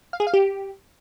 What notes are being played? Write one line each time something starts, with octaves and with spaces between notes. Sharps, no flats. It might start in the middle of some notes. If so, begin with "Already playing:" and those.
F5
G#4
F5
G4